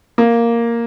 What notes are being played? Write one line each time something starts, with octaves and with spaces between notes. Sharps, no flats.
A#3